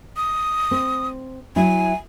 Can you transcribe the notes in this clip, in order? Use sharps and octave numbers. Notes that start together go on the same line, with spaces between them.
D#6
C4
F#3 E4 G#5